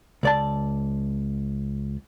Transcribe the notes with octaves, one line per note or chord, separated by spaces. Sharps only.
C#2 D5 A5